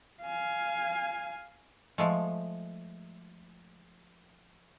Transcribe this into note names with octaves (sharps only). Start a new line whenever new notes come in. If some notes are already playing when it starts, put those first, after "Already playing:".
F5 G#5
F3 G#3 A3